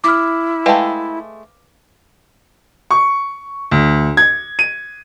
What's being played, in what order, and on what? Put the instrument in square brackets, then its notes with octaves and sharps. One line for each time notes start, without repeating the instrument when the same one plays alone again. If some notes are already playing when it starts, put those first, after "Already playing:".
[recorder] E4 [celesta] D6 F6
[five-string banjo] G#3 A3 [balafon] B4 F5 G5
[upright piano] C#6
D2
G#6
D#7